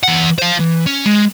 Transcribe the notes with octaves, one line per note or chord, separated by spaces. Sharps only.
E3 F#5
C5 F5
E3
C#4
G#3